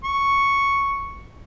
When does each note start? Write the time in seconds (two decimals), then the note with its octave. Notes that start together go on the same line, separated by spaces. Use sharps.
0.05 C#6